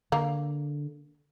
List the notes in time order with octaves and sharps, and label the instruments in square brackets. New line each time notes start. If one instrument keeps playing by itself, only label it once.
[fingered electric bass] D3 [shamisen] A#3